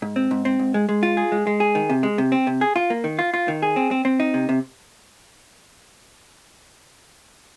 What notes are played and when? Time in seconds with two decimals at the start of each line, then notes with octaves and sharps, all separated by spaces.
0.02 G#2
0.16 C4
0.31 G#2
0.45 C4
0.59 G#2
0.74 G#3
0.89 G#3
1.03 F4
1.17 G#4
1.32 G#3
1.47 G#3
1.60 G#4
1.75 D#3
1.90 C3
2.03 G#3
2.18 C3
2.32 C4
2.47 C3
2.61 G#4
2.76 F4
2.90 A#3
3.04 D#3
3.19 F4
3.34 F4
3.48 D#3
3.62 G#4
3.76 C4
3.91 C4
4.05 C4
4.20 D#4
4.34 C3
4.49 C3